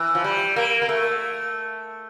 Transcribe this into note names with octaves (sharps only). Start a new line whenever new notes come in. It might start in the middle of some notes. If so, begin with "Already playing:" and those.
Already playing: E3
F3
G3
A#3
A#3
A3